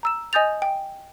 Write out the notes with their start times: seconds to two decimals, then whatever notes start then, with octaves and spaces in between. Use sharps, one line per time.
0.03 A#5 E6 E7
0.33 D#5 G#5 D#6 G6 A6 F7
0.62 G5